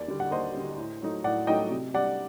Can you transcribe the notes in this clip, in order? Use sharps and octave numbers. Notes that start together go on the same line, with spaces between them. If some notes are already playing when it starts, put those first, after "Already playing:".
Already playing: D#2 D5
D3 G3
F#5
D#2 C5 D#5
D3 G3
A2
F#3 A3 D#4
A2 D5 F#5
F#3 A3 D#4 D#5 G5
C3
G3 D4 D5 F#5